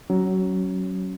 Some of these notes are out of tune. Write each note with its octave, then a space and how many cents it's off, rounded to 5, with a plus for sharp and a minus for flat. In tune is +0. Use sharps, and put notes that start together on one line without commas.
F#3 +20 C#4 +0